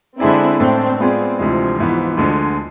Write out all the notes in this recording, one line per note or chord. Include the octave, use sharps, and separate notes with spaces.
D3 G#3 C4 D4 E4 G#4 D5
A2 G#3 C4 D4 A4 D5
G#3 B3 C4 F4 G#4 D5
D2 C3 E3 F3 G#3
G#2 E3 B3
D2 D3 G#3